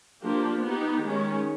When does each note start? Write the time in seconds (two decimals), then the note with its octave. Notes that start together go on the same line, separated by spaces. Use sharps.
0.22 F3 A#3 D4 G4
0.61 B3 D#4 G4
1.01 D#3 G#3 C#4